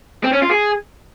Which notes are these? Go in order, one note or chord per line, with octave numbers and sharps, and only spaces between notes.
C4
C#4
F4
G#4